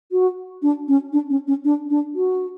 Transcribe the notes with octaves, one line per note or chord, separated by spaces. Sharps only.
F#4
D4
C#4
D4
C#4
C#4
D4
D4
F#4